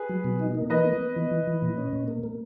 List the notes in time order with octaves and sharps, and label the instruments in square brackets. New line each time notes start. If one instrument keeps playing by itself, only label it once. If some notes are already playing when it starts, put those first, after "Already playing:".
Already playing: [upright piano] G#4 B4
[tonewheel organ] F#3
B2
D#4
A#3
[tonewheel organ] E3 [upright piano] B4 D#5
[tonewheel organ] B3
B3
E3
E3
E3
A#2
C#4
A#2
A#3
A#3